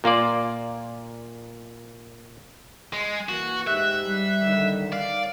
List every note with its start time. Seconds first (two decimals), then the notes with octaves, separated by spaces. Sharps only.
0.04 A#2 A#3 F4 D5
2.93 G#3
3.29 E3 A#3 F#4
3.67 G#2 G4 E5 F#6
4.03 G3
4.42 D3 D#3
4.93 D5 F5